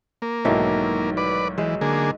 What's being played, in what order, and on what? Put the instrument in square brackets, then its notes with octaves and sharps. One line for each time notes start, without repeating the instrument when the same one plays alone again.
[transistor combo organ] A#3
[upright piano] B1 G#2 F#3 [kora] D#3 E3 A3
[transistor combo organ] B4 D5
[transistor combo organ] E3 [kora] G#3 C5
[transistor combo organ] D3 A#3 G#4